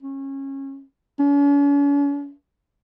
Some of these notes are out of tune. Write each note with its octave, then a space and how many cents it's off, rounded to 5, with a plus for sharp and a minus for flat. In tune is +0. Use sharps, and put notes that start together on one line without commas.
C#4 -25
C#4 +45